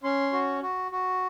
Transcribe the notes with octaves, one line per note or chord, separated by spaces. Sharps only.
C#4 C6
F#4
F#4
F#4